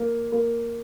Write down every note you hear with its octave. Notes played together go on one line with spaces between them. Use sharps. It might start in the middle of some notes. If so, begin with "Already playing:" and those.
Already playing: A#3
A#3